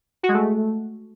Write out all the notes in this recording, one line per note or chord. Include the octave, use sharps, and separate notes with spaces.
F#4
G#3
A3